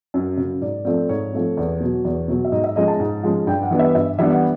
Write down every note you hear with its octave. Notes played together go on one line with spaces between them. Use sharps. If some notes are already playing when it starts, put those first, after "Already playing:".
F#2
C#3 F#3
G#2 D5
F3 A3 C4 D5
G#2 C#5
F3 A3 C4
E2
B2 F#3
E2
B2 F#3
E5
G#2 D#5
E5
F3 G#3 C#4 D#5
A5
G#2
F3 G#3 C#4
G2 G5
F#5
E3 G3 B3 D4
E5
G2 E5
E3 G3 B3 D4 E5
F#5